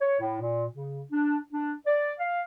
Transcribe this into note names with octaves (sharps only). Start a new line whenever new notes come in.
C#5
A2
A#2
C#3
D4
D4
D5
F5